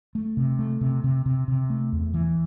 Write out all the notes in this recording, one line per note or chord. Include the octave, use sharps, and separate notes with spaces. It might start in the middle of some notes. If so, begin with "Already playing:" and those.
A3
C3
A3
C3
C3
C3
C3
A3
E2
E3